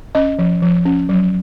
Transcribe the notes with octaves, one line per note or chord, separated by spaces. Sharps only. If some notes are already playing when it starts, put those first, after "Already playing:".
C#4 D#5
F3
F3
C#4
F#3